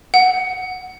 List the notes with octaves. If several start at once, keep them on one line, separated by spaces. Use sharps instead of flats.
F#5